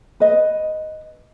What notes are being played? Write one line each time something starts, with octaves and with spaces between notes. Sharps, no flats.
B4 D#5